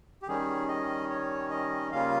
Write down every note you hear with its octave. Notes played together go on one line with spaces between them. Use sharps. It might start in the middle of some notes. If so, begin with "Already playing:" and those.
G4
D#3 G3 C#4 G#4
D#5
C#5
D#5
C#3 G3 A#3 C#4 F4 F5